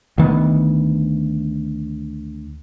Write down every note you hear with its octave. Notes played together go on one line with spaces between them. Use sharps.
D2 D#3 B3